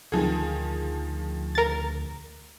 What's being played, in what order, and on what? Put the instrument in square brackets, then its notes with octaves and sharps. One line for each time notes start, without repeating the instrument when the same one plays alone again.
[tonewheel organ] D2 [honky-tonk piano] D#3 F3 G#4
[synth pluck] A#4 A6